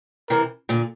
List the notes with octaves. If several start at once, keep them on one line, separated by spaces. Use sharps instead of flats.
C3 E3 A#4
A#2 D3